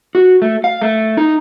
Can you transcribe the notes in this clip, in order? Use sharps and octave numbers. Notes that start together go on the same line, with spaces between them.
F#4
A3
F5
A3
D#4